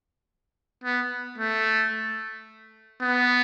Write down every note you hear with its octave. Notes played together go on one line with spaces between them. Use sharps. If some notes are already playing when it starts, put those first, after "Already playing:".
B3
A3
B3